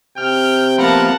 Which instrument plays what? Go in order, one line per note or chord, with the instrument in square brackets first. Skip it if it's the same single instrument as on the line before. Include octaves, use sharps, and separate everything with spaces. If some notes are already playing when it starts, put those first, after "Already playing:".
[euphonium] C3 [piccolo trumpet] G5 [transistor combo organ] F6
[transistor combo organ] F3 A#3 B3 [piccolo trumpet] A#4 [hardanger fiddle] F#5 A5